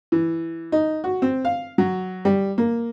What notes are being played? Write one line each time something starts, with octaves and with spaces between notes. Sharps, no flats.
E3
D#4
F#4
C4
F5
F#3
G3
A#3